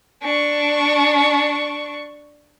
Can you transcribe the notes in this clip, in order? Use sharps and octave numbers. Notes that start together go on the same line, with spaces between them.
D4 C#6